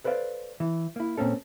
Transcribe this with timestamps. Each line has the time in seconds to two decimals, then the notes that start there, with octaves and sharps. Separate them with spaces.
0.04 A4 B4 C5 D5 F5
0.60 E3
0.96 A#3 E4
1.18 A#2 A#3 C4 C#4 A4